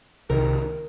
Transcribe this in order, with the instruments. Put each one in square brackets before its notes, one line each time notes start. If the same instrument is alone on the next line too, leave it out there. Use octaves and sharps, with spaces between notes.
[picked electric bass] C2 C3 D#3 [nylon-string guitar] A#4